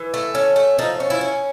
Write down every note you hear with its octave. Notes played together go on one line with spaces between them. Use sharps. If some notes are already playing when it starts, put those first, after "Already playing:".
Already playing: E3
A3
C#4
A3
F3 D#4
C#4
E4
C#4